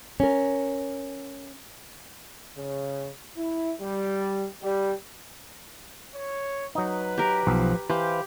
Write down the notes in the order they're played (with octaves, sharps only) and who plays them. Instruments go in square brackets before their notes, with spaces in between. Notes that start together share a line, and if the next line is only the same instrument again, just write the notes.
[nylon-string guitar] C#4 A#4
[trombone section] C#3
E4
G3
G3
[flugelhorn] C#5
[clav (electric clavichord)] F#3 D#4 [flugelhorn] B4
[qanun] G4 A#4
[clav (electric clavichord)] B1 [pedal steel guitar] F3
[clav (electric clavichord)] E3 [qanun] G4 [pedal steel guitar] B4 C5 F5